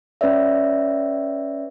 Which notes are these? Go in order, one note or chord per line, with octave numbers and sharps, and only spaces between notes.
C#4 B4 C#5 D5 E5